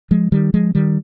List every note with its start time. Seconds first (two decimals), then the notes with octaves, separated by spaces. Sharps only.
0.11 F3 G#3
0.32 D#3 G3
0.54 F3 G#3
0.75 D#3 G3